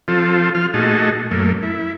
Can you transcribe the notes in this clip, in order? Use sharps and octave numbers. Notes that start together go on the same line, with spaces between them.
F3 C4 F4 A4
F3 F4 F6
A#2 A3 D#4 F#4 G#4 A5
F#2 A3 A#3
E4